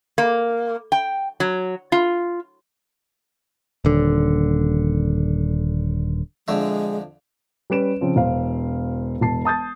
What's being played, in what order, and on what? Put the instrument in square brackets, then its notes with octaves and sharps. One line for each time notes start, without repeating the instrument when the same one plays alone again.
[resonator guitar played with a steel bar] A#3
G5
F#3
F4
[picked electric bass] D#1 D3
[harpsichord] F2 D3 E5 [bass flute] G#3
[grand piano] G3 C#4 B4 D7 E7
C#3 F3 C4
E1 C5 F5
E1 A5 C7
A5 D#6 G6 A6